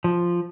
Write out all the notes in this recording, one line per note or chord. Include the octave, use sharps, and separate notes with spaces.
F3